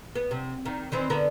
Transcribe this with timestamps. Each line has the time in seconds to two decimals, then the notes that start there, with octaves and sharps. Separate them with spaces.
0.15 B3
0.31 C3
0.65 D#3
0.92 D#3 E3 C4
1.10 D3 B3 A#4